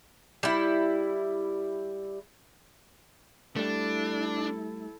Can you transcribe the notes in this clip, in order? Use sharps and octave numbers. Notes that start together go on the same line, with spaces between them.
G3 E4
G3 A3 D4 E4 A4